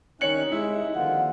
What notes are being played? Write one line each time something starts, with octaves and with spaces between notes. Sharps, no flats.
C2 D#3 C#4 D#4 C#5 F#6 C#7 F#7
G#3 E4 E5
D3 D#3 F3 G3 A#3 F4 F#5